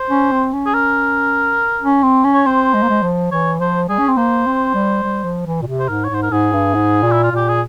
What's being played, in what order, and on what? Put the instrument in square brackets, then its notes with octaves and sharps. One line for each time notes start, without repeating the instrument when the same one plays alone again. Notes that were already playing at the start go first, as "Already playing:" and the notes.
Already playing: [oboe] C5
[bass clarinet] C#4
C4
C#4
[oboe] G#4
A#4
[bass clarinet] C#4
C4
C#4
[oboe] C#5
[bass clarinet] C4 [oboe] C5
[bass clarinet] G#3
A#3
G#3
F3
[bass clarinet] E3 [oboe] C#5
[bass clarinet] F3 [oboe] C5
[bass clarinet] G3 [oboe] G#4
[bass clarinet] C#4
C4
[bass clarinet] A#3 [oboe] C5
[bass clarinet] C4
G3
G3
F3
E3
A#2
C3
[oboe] C5
[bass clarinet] G#2 [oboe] A#4
[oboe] C#5
[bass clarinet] G#2 [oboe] C5
[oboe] A#4
[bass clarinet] G#2 [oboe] G#4
[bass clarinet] G2
G#2
A#2
[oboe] E4
F4
[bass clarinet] A#2 [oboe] G4
[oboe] G#4